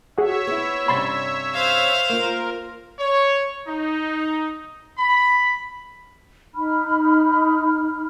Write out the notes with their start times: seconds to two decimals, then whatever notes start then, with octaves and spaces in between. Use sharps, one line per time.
0.18 F#4 G#4 C#5 E5 F#5
0.47 B3 E4
0.88 G2 C3 C#4 B5 C6 A6
1.55 C5 F5
2.09 A#3 F4 A#4
2.98 C#5
3.68 D#4
4.98 B5
6.54 D#4 B5 F6